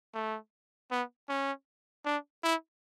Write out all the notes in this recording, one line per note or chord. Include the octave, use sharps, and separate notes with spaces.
A3
B3
C#4
D4
E4